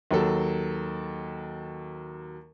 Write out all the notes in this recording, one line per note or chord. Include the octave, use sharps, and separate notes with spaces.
D#2 F#3 A4